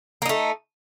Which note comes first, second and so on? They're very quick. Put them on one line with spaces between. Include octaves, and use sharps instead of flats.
A#3 D#4 A3